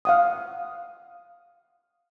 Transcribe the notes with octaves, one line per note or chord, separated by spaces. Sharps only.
F5 F#5 D#6